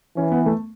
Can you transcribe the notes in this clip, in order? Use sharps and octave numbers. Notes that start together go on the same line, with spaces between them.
E3 C#4
B3
A3